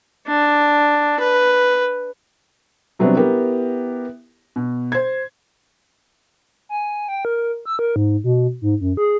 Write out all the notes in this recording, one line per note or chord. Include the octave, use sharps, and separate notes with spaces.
D4
B4
C3 F#3 G3 B3 C4 D4
B3 E4 G4 A#4
B2
C5 G#6
G#5
G5
A#4
E6
A#4
G#2
B2
G#2
F#2
G#4